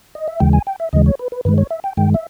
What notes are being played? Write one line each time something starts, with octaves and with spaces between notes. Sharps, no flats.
D#5
E5
D#2 C#3 E3 G#3 G5
G#5
G5
E5
D#2 C#3 E3 G#3 D#5
C#5
B4
B4
G2 D#3 G#3 B4
C#5
E5
G5
G2 D#3 G#3 G5
E5